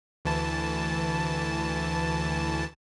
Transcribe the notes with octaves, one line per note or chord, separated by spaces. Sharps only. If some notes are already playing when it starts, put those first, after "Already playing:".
D2 E3 A5